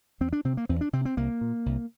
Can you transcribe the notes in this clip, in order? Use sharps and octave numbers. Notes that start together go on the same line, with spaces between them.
E2 C4
D4
C3 C4
A#3
E2 C4
D4
C3 C4
C4
C2 A#3
A#2
C2